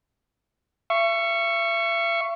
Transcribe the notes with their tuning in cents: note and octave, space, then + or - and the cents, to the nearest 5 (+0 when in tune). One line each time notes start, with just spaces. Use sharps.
E5 +40 C#6 +0